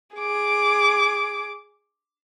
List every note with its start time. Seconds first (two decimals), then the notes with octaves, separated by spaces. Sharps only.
0.16 G#4 D6